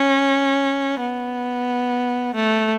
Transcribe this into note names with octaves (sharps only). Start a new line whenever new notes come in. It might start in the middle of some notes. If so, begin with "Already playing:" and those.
Already playing: C#4
B3
A3